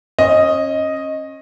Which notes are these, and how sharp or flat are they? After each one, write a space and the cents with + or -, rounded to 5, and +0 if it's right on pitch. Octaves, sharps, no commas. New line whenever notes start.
C#4 -30 D#5 +0